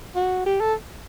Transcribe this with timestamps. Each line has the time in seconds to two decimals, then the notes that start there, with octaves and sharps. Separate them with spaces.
0.15 F#4
0.46 G4
0.60 A4